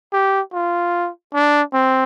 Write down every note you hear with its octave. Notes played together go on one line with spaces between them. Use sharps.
G4
F4
D4
C4